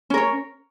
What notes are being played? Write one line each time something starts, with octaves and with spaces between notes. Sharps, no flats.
C#4 A#4 C#5